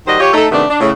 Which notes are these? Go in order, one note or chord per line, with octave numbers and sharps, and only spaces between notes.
D#3 G3 F#4 C5 D#5
F4 G4 C#5
A3 D#4 A4
C3 D#3 A3 B3 D4
D4
A2 C#3